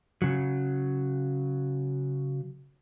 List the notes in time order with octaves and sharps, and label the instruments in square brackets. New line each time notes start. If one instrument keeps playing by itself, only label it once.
[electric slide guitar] C#3 F#3